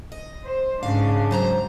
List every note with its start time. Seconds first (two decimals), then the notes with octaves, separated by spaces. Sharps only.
0.12 D#5
0.46 C5
0.83 G#2 C#3 D4 F5
1.31 F#3 C5 A#5